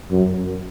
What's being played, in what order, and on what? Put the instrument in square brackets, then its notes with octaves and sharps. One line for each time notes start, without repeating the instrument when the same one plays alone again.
[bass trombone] F#2